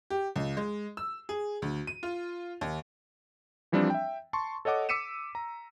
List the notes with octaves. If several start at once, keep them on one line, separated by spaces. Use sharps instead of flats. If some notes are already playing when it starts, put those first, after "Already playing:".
G4
C#2
G#3
E6
G#4
D2
D#7
F4
D#2
E3 F3 G3 C4 D4
E5 G5
A5 C6 C#6
A4 C#5 D#5 F#5 D6
D6 E6 B6 C#7 D#7 E7
A#5